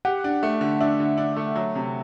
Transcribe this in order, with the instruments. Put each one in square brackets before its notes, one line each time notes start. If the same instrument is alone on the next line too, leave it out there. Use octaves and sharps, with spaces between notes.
[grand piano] G4 [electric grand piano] F#5
[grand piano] D4
A3
D3
[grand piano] D4 [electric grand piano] E5
[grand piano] D3
D4
A3
F#3
C3